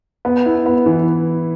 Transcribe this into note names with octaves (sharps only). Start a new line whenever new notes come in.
B3
E4
B3
E3